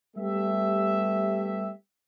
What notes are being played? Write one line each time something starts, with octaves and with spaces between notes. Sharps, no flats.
G3 A3 B3 G4 E5